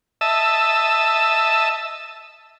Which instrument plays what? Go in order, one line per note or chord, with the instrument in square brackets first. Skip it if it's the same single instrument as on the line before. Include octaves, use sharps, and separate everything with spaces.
[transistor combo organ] D#5 E5 A5 E6